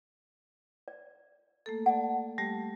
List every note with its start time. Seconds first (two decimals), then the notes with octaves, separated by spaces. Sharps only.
0.88 D5
1.66 A3 A#3 A4
1.86 D5 F#5 A5
2.38 G3 A3 G4